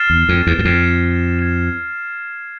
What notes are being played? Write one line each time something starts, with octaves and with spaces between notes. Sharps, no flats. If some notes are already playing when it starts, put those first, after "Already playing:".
Already playing: F6 A6 C7 E7
E2
F2
E2
F#2
F2 F6 A6 C7 E7
G#6 C7 E7